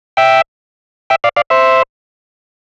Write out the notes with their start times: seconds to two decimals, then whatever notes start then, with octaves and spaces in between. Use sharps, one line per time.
0.17 E5 G5
1.10 E5 G5
1.24 D5 F5
1.37 D5 F5
1.50 C5 E5